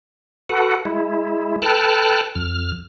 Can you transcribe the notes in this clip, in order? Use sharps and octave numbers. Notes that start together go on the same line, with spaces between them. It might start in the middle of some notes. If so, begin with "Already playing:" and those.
F#4 A4 B4 F#5
G#3 E4
A4 B4 G5 A5 F6 F#6
F2 F6